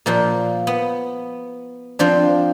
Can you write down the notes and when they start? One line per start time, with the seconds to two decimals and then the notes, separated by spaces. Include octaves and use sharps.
0.06 A#2 F3 A#3
0.67 B3
1.99 F3 C4 D4